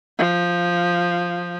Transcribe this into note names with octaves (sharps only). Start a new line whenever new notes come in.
F3